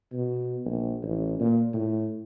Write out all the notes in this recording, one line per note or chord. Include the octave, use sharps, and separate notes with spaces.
B2
A#1
A1
A#2
A2